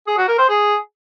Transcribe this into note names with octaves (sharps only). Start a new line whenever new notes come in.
G#4
F#4
A#4
C5
G#4